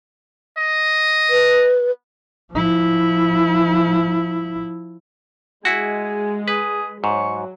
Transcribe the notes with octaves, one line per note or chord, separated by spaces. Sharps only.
D#5
B4
F3 E4
G#3 E4 F#4 G#5
G#4 B4
G#2 F#3 C#6